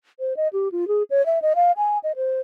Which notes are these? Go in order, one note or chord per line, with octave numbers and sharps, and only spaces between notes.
C5
D#5
G4
F4
G#4
C#5
E5
D#5
F5
G#5
D#5
C5